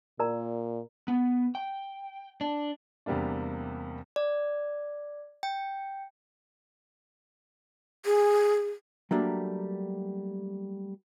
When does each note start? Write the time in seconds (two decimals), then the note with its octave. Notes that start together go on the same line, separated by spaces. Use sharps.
0.20 A#2 A#4 D5 A#5
1.08 B3
1.55 G5
2.41 D4
3.06 E2 C3 G3 A#3 D4
4.16 D5
5.43 G5
8.05 G#4
9.11 F#3 G3 A3 A#3 D4